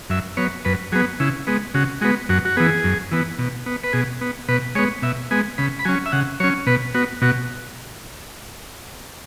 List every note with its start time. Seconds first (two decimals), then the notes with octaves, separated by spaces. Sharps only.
0.10 F#2 E5
0.37 F#3 B3 C#5
0.65 F#2 B4
0.92 F#3 B3 G#4
1.20 C#3 E4
1.47 G#3 B3
1.74 C#3 F#4
2.01 G#3 B3 F#4
2.29 F#2 F#4
2.45 F#4
2.57 E3 B3 G#4
2.84 F#2
3.11 E3 B3
3.39 B2
3.66 B3
3.84 B4
3.93 B2 G#4
4.21 B3
4.48 B2 B4
4.75 G#3 B3 C#5
5.02 B2 E5
5.31 G#3 B3 G#5
5.58 C#3 B5
5.79 B5
5.85 F#3 C#4 G#5
6.06 E5
6.12 C#3 F#5
6.40 F#3 C#5
6.44 C#4
6.67 B2 B4
6.95 B3 F#4
7.22 B2 F#4